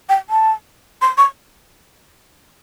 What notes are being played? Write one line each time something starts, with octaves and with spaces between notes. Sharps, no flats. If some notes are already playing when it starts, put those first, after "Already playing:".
G5
A5
C6
C#6